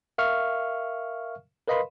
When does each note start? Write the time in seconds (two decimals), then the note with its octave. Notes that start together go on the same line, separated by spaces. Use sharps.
0.18 A#4 E5 F5 C#6 F6
1.67 A#4 B4 D#5 F5 B5 C6